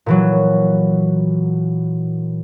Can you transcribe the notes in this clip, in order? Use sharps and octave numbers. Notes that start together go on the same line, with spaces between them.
A#2 E3 F#3